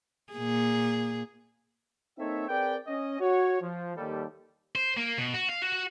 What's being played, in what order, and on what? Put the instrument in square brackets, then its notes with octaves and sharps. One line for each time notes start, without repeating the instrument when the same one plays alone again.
[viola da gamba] A#2 G#4
[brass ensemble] A#3 C4 D#4 A4 C#5 E5
C4 G#4 A#4 B4 D5 G5
C#4 D#5
F#4 C#5
F3
D#2 G3 A4
[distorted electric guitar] C5
A#3
B2
F#4
F5
F#4